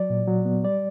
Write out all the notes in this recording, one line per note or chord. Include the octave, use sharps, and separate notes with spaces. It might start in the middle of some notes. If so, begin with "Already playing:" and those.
Already playing: F#3 D5
A#2
F#3
B3
G3 D5